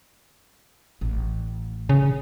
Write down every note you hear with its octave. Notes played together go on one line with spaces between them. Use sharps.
A1 A2
C#3